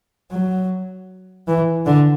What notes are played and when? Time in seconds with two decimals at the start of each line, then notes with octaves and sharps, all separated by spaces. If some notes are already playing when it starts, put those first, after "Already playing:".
0.31 F#3
1.48 E3
1.86 D3